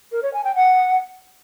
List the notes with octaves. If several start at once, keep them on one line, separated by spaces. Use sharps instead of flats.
A#4
C#5
G#5
G5
F#5